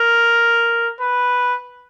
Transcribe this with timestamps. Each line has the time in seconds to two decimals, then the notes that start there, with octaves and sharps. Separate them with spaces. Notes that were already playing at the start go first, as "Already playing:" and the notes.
Already playing: A#4
1.01 B4